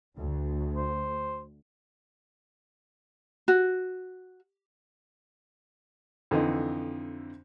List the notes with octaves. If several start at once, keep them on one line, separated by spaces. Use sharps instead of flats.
D2
C5
F#4
F2 D3 E3 D#4